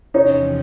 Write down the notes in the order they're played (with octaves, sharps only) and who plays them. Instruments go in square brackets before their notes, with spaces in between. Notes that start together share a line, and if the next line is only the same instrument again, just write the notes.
[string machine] E2 C3 F3 [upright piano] C#4 D#4